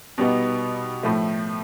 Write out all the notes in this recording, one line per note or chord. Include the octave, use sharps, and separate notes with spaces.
B2 G3 B3 D#4
A2 F3 A3